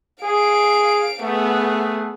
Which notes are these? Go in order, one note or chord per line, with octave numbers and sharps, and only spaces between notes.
G#4 F5 D7
A3 B3 G#4